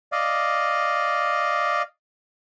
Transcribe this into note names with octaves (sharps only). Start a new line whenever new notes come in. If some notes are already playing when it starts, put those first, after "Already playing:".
D5 D#5 F5